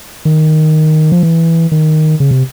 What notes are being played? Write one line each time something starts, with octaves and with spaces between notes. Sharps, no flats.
D#3
F3
E3
D#3
C#3
C3